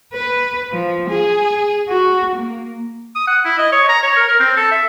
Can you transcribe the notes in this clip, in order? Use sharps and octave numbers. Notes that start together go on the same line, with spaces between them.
B4
F3
G#4
F#4
A#3
D#6
F#5
E4
D#5
C#5
A#5
C#5
A#4
A#4
C4
A4
E5